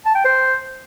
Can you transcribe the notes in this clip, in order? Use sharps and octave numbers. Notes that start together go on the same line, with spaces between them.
A5
G5
C5